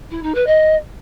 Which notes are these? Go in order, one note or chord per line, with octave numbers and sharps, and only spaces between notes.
E4
D#4
B4
D#5